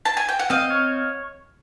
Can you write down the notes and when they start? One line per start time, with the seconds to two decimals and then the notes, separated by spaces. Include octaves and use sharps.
0.05 A5
0.17 G#5
0.29 G5
0.39 F#5
0.50 C4 D#5 F5
0.70 C#5